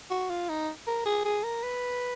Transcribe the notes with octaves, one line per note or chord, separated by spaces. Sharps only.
F#4
F4
D#4
A#4
G#4
G#4
A#4
B4